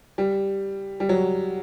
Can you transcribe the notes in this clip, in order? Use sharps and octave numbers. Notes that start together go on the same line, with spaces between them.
G3
G3
F#3